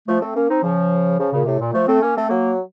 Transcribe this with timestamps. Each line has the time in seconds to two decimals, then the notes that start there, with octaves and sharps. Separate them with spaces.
0.08 F3 A3
0.21 A3 C4
0.36 A#3 C#4
0.49 C4 D#4
0.63 C#3 F3
1.18 C#3 F3
1.33 A#2 C#3
1.46 A2 C3
1.60 A#2
1.73 F3 A3
1.87 A3 C4
2.02 A#3 C#4
2.15 A3 C4
2.29 F#3 A#3